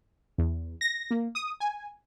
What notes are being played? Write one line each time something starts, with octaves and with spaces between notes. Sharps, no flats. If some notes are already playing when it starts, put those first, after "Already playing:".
E2
A#6
A#3
D#6
G#5